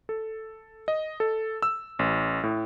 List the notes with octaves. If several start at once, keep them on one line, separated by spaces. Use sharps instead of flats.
A4
D#5
A4
E6
A1
A2